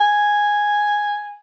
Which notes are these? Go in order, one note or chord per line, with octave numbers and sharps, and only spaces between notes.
G#5